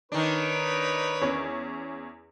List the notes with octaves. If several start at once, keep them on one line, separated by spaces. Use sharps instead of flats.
D#3 D4 D#4 B4 C#5
E2 C#4